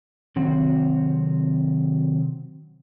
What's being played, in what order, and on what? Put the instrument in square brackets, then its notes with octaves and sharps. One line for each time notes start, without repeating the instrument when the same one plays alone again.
[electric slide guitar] C3 D#3 F#3 C4 F#4